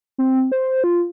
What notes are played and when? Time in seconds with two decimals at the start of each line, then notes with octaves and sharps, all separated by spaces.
0.18 C4
0.52 C5
0.84 F4